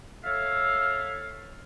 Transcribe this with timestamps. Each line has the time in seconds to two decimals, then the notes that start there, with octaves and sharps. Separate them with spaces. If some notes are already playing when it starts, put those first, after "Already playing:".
0.24 A4 C#5 E5 F5